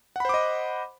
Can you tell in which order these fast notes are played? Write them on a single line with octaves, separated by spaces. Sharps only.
F#5 B5 C5 D6 D#5